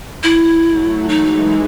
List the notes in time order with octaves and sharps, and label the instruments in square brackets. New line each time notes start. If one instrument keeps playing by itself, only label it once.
[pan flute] E4
[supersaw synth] F#3 A3
[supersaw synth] E3 G#3 [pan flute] D#4